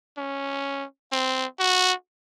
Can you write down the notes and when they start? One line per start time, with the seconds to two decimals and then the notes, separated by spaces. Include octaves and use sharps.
0.18 C#4
1.12 C4
1.59 F#4